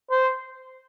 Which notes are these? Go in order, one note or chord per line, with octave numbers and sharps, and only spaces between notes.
C5